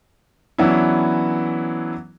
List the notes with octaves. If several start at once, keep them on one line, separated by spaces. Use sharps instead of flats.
E3 F#3 B3 C#4 D4 E4